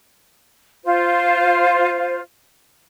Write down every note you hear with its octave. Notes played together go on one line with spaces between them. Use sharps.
F4 C5